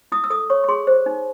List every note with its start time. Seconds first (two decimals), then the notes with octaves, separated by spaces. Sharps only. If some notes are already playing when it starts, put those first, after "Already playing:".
0.12 E4 D#6
0.24 E6
0.30 A4 D#6
0.50 C#5 C#6
0.64 C#6
0.69 G#4 C6
0.87 C5
1.06 D#4